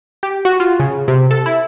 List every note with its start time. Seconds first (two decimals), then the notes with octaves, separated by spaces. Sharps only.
0.23 G4
0.45 F#4
0.60 F4
0.80 C#3
1.08 C3
1.31 A4
1.46 E4